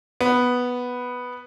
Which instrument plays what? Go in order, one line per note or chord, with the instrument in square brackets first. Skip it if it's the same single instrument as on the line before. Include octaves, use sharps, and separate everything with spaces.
[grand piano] B3